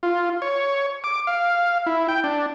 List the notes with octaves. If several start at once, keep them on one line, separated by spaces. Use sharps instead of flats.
F4
C#5
D6
F5
E4
G5
D4